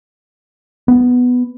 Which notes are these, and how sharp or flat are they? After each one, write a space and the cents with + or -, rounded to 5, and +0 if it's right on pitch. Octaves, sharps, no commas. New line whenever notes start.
B3 +5